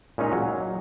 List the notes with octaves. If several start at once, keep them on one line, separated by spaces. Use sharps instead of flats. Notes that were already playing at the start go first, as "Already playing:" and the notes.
A#2 G#3 C#4 D#4 D#5 A#5
F#3